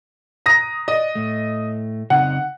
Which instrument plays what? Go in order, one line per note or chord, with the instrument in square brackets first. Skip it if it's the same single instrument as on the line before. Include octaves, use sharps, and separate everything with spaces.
[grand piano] A#5 D#6 A#6
[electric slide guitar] D5 [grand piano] D#5
[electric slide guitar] A2 A3
[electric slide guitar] C#3 C4 D#4 [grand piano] F#5